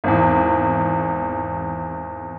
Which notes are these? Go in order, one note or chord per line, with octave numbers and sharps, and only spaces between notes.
G#1 E2